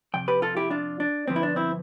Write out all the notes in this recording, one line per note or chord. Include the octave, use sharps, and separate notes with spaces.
F2 C3 G5
G4 B4
F4 A4
E4 G4
D4 F4
D4
G2 D3 F3 B3 C4
E4
D4
C4 E4